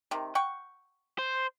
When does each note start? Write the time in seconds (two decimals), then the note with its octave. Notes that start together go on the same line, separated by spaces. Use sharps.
0.11 C3 D#3
0.35 F#5 G5 C#6
1.19 C5